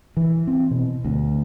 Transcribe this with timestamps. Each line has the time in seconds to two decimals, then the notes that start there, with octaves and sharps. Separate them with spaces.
0.17 E3
0.47 C4
0.71 B2
1.05 D2